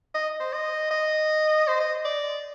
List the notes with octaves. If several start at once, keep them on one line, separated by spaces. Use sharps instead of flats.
D#5
C5
D#5
D#5
C5
D#5
D5